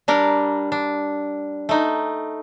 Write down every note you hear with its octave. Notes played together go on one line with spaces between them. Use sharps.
G3 D4 A#4
D4
A3 D#4